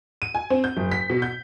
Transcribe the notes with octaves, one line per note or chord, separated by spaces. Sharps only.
D#7
G#5
C4
G6
F#1
B6
B2
G6